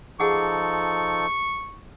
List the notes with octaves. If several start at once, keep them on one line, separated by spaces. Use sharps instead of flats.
F3 D#4 G#4 A4 F#5 C#6 D6